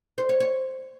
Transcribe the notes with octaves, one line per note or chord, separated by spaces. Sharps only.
C5
C#5
C#5